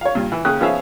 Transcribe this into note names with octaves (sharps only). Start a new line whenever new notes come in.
C#5 F5
G2 A#2
E3
D#2 C#3 D#6 F#6
F3 B3 C#4 G#4 E5 F5